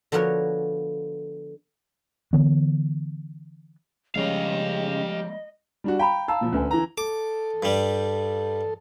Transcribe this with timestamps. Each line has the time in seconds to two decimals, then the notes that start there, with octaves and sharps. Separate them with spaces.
0.12 D3 F3 B3 F#4 A#4 C#5
2.33 D3 E3 B3
4.16 C#3 F3 G3 G#3 G4 D#5 F5
5.84 G3 D4 F#4
5.99 F5 G5 A#5 B5
6.28 D#4 F5 A5 A#5 E6
6.41 A#2 F3
6.52 D2 C#4 B4 G#5
6.71 E3 A#5
6.98 A4 D6
7.63 G2 G3